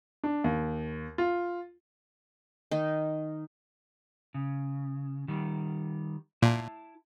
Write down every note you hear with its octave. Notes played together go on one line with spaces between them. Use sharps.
D4
D#2
F4
D#3 D#4
C#3
D#3 G3
A#2 E4 A5